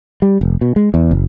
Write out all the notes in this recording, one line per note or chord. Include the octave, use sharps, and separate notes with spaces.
G3
F1
B2
G#3
E2
F#1